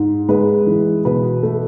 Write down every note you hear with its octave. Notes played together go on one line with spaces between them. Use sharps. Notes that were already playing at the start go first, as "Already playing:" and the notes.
Already playing: G#2
G#3 B4
E3
B2 B4
A3